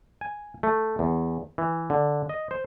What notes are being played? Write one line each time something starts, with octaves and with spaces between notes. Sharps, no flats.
G#5
A3
E2
E3
D3
D#5
C5